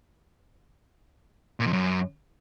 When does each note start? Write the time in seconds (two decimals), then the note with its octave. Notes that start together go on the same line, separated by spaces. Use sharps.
1.60 A#2
1.66 F2
1.73 F#2